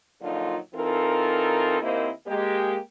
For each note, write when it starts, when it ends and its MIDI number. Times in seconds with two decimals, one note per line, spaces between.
0.22 0.57 46
0.22 0.57 50
0.22 0.57 53
0.22 0.57 54
0.22 0.57 63
0.22 0.57 65
0.75 1.80 52
0.75 1.80 60
0.75 1.80 63
0.75 1.80 65
0.75 1.80 69
0.75 1.80 70
1.81 2.09 39
1.81 2.09 58
1.81 2.09 60
1.81 2.09 64
1.81 2.09 72
1.81 2.09 75
2.27 2.78 56
2.27 2.78 58
2.27 2.78 67